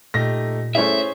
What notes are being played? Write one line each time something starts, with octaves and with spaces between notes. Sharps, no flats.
A#2 A3 D#4 G4 A#6
A3 C#4 E4 G#4 C5 C#5 E5